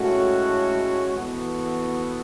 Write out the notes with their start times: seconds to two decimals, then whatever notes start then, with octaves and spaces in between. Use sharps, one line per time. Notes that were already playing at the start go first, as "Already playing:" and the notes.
Already playing: A2 G#3 C#4 F#4 A4
1.14 E3 B3 F#4 A4